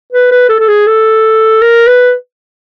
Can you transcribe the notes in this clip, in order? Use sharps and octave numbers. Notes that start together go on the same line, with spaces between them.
B4
B4
A4
A4
G#4
A4
A#4
B4